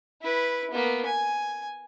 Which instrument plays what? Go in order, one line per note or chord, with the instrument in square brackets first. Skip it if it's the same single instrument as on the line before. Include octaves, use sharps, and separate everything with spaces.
[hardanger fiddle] E4 B4
A#3 B3
G#5